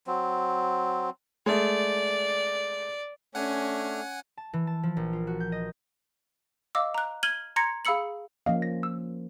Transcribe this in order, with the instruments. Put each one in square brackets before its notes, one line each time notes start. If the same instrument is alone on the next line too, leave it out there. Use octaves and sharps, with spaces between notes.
[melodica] F#3 C4
[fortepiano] G#3 A3 [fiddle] D5
[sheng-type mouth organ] A3 D4 F6 [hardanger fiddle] C#4 [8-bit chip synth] F#5 G#5
[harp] A5
E3
A5
F3
A#1
F4
F#4
G6
D#5
[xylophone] D#5 F5 D6 E6
A#5 F#6
F6 G#6 D#7 F#7 G7
A#5 C6 G#6 A#6 C#7
G#4 F5 B5 E6 C#7 F#7
[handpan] F3 A#3 C#4 [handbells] D#5 F5
[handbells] A#6
E6